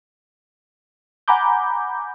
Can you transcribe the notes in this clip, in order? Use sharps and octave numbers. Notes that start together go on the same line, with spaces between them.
F#5 G#5 A#5 B5 D6 G6